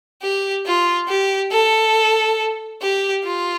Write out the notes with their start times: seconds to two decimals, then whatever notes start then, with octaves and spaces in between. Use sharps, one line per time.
0.22 G4
0.66 F4
1.08 G4
1.52 A4
2.82 G4
3.24 F4